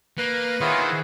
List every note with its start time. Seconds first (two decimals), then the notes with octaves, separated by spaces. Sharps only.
0.18 A#3 B4
0.61 D#3 B3 E4 F4 G#4 C5 C#5
0.84 F#5